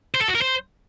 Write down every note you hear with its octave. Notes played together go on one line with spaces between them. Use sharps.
C5
A4
F#4
A#4
C5